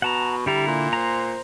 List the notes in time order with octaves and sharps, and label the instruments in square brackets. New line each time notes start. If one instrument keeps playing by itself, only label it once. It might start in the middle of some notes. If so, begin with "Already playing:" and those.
[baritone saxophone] B2 [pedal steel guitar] F#5 A5 A#5
[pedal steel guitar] D3 E4 A#5 [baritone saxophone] G3
[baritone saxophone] A#2
[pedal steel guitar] C5 A#5